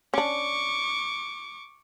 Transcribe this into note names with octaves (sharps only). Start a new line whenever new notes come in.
C#4 D4 C#6 D6